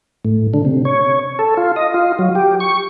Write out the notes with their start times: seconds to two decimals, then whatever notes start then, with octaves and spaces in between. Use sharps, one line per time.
0.25 A2
0.54 D3
0.65 C3
0.85 C#5
1.39 A4
1.57 F4
1.76 D#5
1.94 F4
2.19 F#3
2.35 G4
2.60 C#6